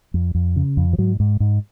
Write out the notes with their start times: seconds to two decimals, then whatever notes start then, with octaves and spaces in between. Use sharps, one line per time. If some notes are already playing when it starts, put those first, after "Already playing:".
0.14 F2
0.35 F2
0.56 C#3
0.77 F2
0.93 F3
0.98 G#2 F#3
1.20 G#2
1.40 G#2